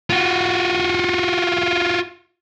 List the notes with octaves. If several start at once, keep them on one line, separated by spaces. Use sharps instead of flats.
F4 F#4